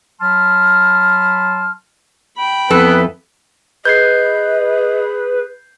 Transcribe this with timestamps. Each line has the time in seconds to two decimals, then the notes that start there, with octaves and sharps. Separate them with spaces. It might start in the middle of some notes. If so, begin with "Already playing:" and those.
0.21 F#3 A5 B5 C6 F6
2.37 G5 B5
2.71 F2 E3 B3 A4 B4
3.85 G#4 B4 D#5 G6 G#6 C7